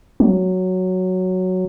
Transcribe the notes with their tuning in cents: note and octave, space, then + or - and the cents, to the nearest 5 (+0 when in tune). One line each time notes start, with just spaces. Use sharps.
F#3 +0